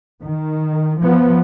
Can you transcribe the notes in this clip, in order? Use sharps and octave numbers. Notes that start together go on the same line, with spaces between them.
D#3
F3 B3